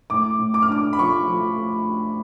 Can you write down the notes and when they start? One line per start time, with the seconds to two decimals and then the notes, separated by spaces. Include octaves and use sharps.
0.10 A2 D6
0.39 A2
0.54 D6
0.62 F6
0.69 D4 D6
0.93 B5
0.98 F3 C#6
1.28 F3